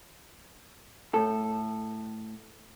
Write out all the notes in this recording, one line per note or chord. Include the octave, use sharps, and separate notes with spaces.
A2 A4